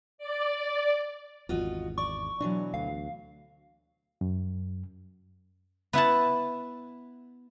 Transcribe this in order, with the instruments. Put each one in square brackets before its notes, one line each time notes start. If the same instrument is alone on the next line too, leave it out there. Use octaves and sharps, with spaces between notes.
[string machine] D5
[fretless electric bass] G#1 E2 [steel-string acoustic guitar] F4 F#4 D#5
[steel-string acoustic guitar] D5 [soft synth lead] C#6
[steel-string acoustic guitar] B2 E3 F#3 [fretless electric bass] D4
[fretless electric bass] D2 [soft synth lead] F5
[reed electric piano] F#2
[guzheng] B3 E4 F#5 A5